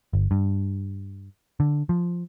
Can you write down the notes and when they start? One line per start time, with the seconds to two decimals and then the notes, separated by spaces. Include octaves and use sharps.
0.13 G1
0.31 G2
1.60 D3
1.89 F3